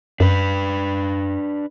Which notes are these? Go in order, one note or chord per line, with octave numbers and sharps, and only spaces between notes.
F#2 D4 B4